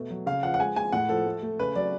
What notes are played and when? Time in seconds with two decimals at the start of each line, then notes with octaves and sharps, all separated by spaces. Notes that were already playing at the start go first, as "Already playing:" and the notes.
Already playing: B2 A3
0.10 F#3
0.26 C#3 F5
0.43 F3 F#5
0.54 F#5
0.60 G#3 G#5
0.76 G#3 G#5
0.92 A2 F#5
1.09 F3 A4
1.26 A3
1.42 A3
1.59 C#3 B4
1.75 F#3 D5